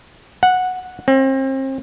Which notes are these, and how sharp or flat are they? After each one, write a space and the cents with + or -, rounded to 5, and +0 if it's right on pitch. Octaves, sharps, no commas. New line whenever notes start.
F#5 -10
C4 +35